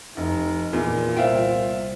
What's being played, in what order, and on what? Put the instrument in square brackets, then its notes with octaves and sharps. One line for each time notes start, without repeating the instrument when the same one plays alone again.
[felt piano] F1 [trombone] D#4
[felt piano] E2 [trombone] A#2 [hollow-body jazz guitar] F4 A#4
[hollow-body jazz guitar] C2 C5 G5 [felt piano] F4 E5 F5